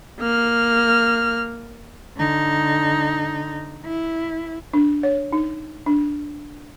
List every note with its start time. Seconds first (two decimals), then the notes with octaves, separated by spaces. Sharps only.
0.20 A#3 F6
2.17 D3 D#4
3.85 E4
4.73 D4
5.03 C#5
5.33 D#4
5.86 D4